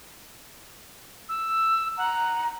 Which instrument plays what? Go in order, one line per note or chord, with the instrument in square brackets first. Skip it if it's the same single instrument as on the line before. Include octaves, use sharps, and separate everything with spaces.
[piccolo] E6
[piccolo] F#5 [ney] A#5